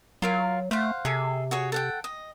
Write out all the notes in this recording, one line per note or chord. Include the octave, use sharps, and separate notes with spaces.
F#3 F4 A#4 F5
A3 C5 F5 F#5
C3 G#4 A4
F#4 G#4 C#5
A4 F#5 G5
D#5